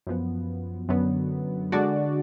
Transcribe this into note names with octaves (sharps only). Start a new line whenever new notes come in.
F#2 F3 B3
F#2 D3 F#3 B3
D3 G#3 D4 F#4 D5